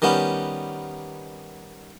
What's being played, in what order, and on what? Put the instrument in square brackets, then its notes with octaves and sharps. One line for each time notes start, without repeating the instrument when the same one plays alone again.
[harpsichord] D#3 G3 B3 C#4